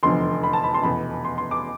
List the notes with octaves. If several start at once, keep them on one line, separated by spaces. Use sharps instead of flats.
F1 E2 D3 F3 C6
B5
A5
B5
C6
F1 E2 B2 B5
C6
C6
D6